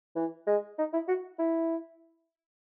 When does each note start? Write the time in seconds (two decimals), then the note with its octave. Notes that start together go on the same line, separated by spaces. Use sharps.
0.16 E3
0.47 G#3
0.78 D#4
0.93 E4
1.08 F#4
1.39 E4